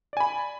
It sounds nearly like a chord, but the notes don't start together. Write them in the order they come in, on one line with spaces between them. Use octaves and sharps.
D5 G#5 B5